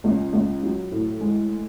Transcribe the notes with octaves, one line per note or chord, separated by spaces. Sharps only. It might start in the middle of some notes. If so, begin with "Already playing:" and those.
C#2
C#2
F#3
A2
G#3